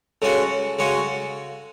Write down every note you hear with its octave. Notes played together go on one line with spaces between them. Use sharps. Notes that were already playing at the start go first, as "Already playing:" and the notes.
C#3 G#3 C#4 F#4 A4
C#3 G#3 C#4 F#4